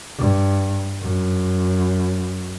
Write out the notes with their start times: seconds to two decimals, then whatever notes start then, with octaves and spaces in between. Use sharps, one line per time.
0.18 G2
1.02 F#2